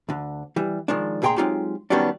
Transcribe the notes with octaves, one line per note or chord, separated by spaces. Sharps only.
D2 D3
E3 G3
D#3 F3 G#3 D4
D2 A#2 G#4 G5 A#5 C6
F#3 G#3 C4 D#4 F4 G4
D#3 F#3 G3 B3 C#4 D4